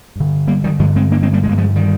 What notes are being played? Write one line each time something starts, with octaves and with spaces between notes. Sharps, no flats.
G2 D3
G3 A#3
D#3 G3
G2 D3 F3 G#3
G#3 C4
A#3 D4
G#3 C4
G3 A#3
G2 D3 G#3 A#3
F3 G#3
D#3 G3